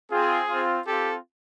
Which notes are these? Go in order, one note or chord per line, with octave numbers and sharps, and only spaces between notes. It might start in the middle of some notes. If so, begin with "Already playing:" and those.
C4 F4 G#4
C4 F4
C4 F4 G4 A4